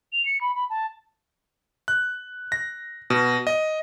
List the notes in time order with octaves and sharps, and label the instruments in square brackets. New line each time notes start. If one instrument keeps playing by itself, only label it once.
[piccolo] F7
C#7
B5
B5
A5
[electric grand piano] F#6
A#6
B2
D#5